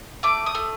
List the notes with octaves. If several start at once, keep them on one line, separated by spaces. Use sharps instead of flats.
A3 D6
D#6
A3